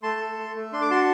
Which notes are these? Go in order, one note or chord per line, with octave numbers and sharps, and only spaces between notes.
A3 A5 C6
A4
A3
A3
D4 C6
D6
F#4 A5 C6